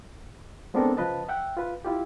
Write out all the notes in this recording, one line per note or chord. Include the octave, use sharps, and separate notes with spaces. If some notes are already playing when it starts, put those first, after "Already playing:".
G#3 B3 C4 D4 A4 A#4
C#3 F3 B4 D#5 A5
E5 F#5 G5
F4 B4
E4 F4 G4